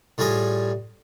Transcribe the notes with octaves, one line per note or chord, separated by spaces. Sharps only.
A2 G3 F4 G#4 A#5